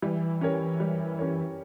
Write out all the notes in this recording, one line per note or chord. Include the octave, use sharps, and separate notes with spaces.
E3 G3
C#4 G4 A#4 C#5
G3
C#4 G4 A#4 C#5